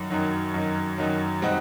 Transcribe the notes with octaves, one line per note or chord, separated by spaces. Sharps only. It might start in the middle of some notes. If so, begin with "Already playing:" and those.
Already playing: F#2 D#3 F#3
F#2 D#3 F#3
F#2 D#3 F#3
F#2 D#3 F#3
B2 G3 C4 D#4 F#4